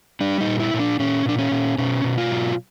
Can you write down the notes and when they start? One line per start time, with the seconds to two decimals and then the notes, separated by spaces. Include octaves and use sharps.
0.21 G3 D4
0.41 D#4
0.47 A#2
0.60 E4
0.74 A#2
0.80 D4
1.00 A#2 C#4
1.26 A#2 D4
1.38 C#4
1.52 A#2
1.78 B2 C#4
2.04 B2
2.18 F4
2.30 F#3